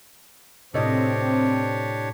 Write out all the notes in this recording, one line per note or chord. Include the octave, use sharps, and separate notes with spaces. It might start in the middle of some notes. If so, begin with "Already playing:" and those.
A2 C3 A3 C4 D4 G4 C#5 D#5